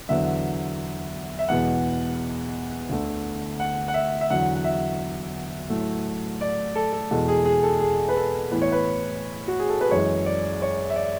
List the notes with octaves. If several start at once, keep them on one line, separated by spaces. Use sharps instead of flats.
E2 D3 F#3 B3 E5
E5
E2 B2 G#3 B3 F#5
D2 D3 A3
F#5
F#5
E5
E5
E2 D3 F#3 F#5
F#5
E5
A2 F#3 A3
D5
A4
A4
E2 B2 G#3 A4
G#4
G#4
A4
G#4
B4
A4
A2 E3 B3 B4
C#5
B4
F#4
G#4
A4
B4
F#2 E3 G#3 C#5
D5
C#5
E5
D5